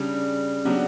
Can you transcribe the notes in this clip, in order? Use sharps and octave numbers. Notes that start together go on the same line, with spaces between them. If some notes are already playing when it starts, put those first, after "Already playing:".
Already playing: C#3 G3 D4
C#3 F#3 B3 D4 G4